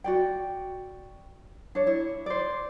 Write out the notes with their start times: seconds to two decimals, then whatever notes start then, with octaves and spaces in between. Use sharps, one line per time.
0.04 F#4 D5 G5
1.75 D4 C#5
1.87 E4
2.26 C5 D5